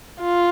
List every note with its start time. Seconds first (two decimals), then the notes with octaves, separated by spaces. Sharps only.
0.21 F4